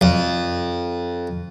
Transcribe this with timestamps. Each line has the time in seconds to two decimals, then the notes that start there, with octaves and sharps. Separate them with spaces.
0.01 F2